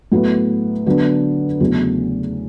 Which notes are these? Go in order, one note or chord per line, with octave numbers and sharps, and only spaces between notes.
A2 F#3 B3
D3 F#3 B3 D4
E2 C#3 F#3 A3